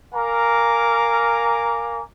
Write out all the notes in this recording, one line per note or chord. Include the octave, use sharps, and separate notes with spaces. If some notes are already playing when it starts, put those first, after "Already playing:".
A#4 F5 G#5 A#5 D6